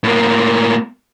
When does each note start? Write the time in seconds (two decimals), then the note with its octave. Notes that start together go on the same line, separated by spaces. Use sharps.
0.04 A2 A#3